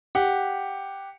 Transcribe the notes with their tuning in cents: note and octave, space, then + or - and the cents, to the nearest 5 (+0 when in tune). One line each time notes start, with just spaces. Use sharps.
G4 +0 F#5 +0